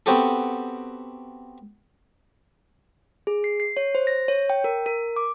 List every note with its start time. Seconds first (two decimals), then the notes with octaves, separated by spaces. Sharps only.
0.06 B3 C4 F#4 G4 A4
3.27 G#4
3.44 C7
3.60 C7
3.77 C#5
3.95 C5
4.07 A#6
4.28 C#5
4.50 G5
4.64 A#4
4.86 A#4
5.16 D6